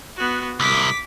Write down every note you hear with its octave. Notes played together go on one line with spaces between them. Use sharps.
B3 F#4
C2 D6 B6